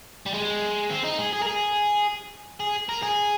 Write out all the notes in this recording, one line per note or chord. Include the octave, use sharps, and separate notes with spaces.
G3
G#3
C4
D#4
G#4
G#4
A#4
G#4
G#4
A#4
G#4